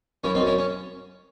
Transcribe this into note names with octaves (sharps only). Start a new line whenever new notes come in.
F#2 C#4 E4
C4 D#4
F#2
C#4 E4
C#4